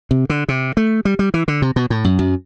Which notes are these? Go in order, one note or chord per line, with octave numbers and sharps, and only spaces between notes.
C3
D3
C3
A3
G3
G3
E3
D3
C3
B2
A2
F#2
F#2